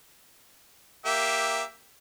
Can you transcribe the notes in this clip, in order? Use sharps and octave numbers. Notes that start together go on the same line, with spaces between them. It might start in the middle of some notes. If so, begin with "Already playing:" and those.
A#3 G4 E5